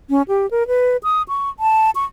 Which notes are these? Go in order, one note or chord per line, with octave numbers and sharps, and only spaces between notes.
C#4
G4
A#4
B4
D#6
C#6
A5
C#6